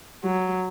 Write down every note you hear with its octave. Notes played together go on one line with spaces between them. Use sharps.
F#3